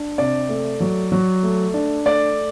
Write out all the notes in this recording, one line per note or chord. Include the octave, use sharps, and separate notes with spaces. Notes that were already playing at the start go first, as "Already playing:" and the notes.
Already playing: D4
C3 D5
A3
F#3
F#3
A3
D4
A3 D5